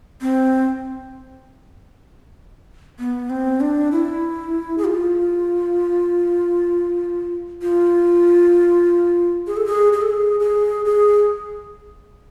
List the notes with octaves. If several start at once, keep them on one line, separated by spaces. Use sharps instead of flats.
C4
B3
C4
D4
E4
G#4
F4
F4
G#4
A4
G#4
G#4
A4
G#4
G#4
G#4